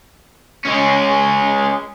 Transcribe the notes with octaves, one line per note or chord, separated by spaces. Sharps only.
G#3 C#4